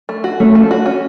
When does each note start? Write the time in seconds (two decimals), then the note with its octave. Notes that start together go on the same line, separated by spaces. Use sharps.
0.09 A3
0.24 F#4
0.40 A3 C#4
0.55 F3
0.71 F#4
0.86 C#4